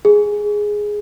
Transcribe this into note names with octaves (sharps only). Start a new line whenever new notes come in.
G#4